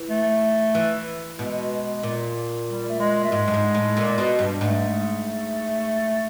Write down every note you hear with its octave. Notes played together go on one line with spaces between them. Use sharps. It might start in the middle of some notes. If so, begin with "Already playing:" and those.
Already playing: E3
A3
E3
B2 G#3
A#2
G3
A3
G#3
A3
G#2 G#3
G2
G#2
A2
A#2
B2
G2
G#2 A3